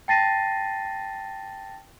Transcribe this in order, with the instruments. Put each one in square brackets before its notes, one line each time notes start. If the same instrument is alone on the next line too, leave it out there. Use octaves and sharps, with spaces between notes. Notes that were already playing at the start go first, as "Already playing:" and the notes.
[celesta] G5 A5 A6 A#6 C7 D#7